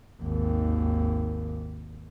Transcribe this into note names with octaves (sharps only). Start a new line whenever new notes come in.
G#1 D#2